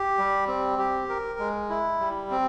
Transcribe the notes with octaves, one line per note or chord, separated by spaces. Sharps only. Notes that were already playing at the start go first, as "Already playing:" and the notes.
Already playing: G4
G3
C4
G4
A#4
G#3
E4
G3
C4